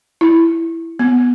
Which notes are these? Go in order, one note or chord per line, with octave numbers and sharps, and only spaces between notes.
E4
B3